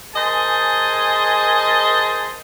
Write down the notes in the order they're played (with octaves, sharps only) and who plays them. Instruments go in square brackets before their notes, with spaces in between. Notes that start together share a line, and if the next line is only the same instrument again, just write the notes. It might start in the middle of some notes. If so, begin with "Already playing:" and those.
[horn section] G#4 A#4 C5 D#5 G#5 A5